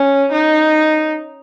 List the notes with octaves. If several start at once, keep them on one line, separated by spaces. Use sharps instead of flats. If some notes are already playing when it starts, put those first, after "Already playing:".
Already playing: C#4
D#4